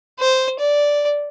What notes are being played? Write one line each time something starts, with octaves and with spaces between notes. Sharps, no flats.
C5
D5